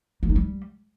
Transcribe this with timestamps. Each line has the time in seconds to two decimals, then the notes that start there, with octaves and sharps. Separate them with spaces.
0.23 A#3
0.29 D#4
0.36 G3